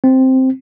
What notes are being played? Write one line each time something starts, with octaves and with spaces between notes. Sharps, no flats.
C4